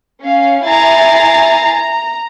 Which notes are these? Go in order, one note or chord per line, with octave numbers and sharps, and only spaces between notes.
C#4 F5
E4 G#5 A#5 A6 C7
A#5